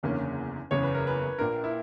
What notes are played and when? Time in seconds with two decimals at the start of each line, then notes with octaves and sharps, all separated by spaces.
0.03 F#1 E2 D3 A#3 C#4
0.71 F#1 E2 C#3 C#5
0.83 B4
0.95 A#4
1.07 B4
1.39 A#1 A#2 A#3 D4 A#4
1.64 E4